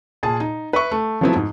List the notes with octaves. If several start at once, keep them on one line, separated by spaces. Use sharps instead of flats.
A#2 G#4 A5
D#4
B4 E5 C#6
A3
F3 F#3 A3 B3 C4 E4
G#2